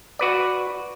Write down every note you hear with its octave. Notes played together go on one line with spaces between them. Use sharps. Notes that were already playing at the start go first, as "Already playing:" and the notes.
F#4 B4 D5